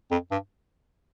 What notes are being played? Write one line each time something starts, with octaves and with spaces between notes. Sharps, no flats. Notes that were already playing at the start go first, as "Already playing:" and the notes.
F2
G2